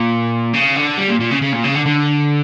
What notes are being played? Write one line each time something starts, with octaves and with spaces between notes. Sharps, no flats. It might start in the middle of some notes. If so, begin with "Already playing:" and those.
Already playing: A#2
C#3
D3
G3
A#2
A#2
C#3
C#3
A#2
C#3
D3
D3